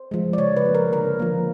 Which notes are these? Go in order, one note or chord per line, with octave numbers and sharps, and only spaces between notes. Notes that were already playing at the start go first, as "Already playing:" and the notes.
Already playing: C5
F3 G#3
D5
C#3 C#5
B4
F3 A#3
A#4
D3 A#4
F3 A#3